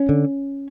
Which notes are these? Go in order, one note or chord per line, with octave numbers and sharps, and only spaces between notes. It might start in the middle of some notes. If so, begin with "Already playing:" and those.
Already playing: C#4
D3